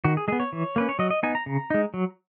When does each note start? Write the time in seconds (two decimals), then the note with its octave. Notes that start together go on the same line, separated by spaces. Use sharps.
0.04 D#3 F#4
0.17 G#4
0.28 G#3 G#4
0.32 B3
0.40 C#5
0.53 E3
0.76 A#3 C#4 B4
0.89 C#5
0.99 F#3 D#5
1.11 D#5
1.23 B3 D#4 G#5
1.35 A#5
1.46 C#3
1.70 G#3 D#4
1.94 F#3